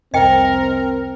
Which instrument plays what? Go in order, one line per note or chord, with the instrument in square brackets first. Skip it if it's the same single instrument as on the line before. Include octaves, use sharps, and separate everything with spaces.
[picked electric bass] F1 C2 [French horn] C4 [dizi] A#4 [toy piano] D#5 G5